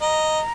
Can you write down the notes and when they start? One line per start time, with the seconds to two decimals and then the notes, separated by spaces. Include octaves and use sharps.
0.01 D#5 A#5